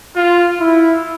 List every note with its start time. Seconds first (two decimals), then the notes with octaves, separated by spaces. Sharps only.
0.16 F4
0.60 E4